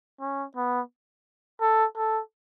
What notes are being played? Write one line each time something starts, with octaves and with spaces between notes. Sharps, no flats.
C#4
B3
A4
A4